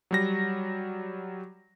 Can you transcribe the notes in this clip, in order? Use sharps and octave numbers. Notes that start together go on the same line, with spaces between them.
F#3 G3 A#6